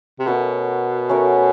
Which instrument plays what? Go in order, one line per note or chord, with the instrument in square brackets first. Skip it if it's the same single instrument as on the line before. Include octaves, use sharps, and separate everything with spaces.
[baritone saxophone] C3
[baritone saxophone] B2 [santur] A3 C#4 F#4 A#4
[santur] A3 C#4 F#4 A#4